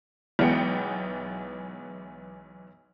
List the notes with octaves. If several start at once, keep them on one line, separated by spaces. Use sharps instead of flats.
B1 E3 G#3 B3 G5 C#7